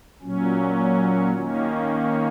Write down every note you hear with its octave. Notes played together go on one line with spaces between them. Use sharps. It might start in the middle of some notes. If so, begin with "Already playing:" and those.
A#2 F#3 C#4
D#3 A#3 C#4